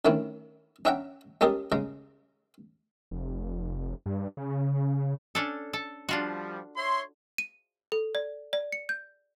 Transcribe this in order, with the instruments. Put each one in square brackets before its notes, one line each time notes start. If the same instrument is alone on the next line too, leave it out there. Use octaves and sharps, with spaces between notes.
[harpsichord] D3 D#3 A3 C4 C#4 E4
C#4 D4 E5 F#5 G5 A#5
G#3 C#4 G4 A4 A#4 D#5
C#3 G#3 A#5
[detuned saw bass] F1
G2
C#3
[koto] C#4 D4 A4
A4
[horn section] F3 G3 [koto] D4 F4 F#4
[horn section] C#5 E5 C6
[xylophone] D#7
A4
D5
D5
C#7
G6